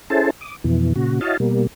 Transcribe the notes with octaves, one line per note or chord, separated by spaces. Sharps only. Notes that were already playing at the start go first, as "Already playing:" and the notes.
C#4 E4 G#4 A4 C5 A5
D6 D#6
F2 B2 E3
A#2 C#3 F#4
E4 F#4 C#5 D#5 F5 A5
B2 G3 A#3